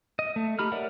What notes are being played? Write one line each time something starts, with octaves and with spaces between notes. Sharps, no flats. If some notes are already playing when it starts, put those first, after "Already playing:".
D#5
A3
D#4 G4 B5 F6
A#4 C#5 D5 E5 F#5